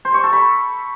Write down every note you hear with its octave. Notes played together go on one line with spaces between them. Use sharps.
C5
C#6
A4
B5